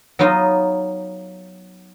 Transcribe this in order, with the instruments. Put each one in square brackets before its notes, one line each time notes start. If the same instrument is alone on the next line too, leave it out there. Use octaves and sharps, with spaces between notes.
[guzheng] F#3 B3 D#4 F4 D#5